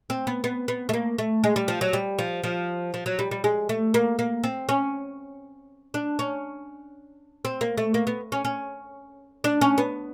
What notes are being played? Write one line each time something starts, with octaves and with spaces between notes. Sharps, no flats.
C4
B3
B3
B3
A3
A#3
A3
G#3
G3
F3
F#3
G3
F3
F3
F3
F#3
G3
G3
G#3
A3
A#3
A#3
C4
C#4
D4
C#4
C4
A#3
A3
A#3
B3
C#4
C#4
D4
C#4
B3